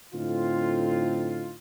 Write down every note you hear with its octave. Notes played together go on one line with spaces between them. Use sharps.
A2 D3 C4 D#4 F4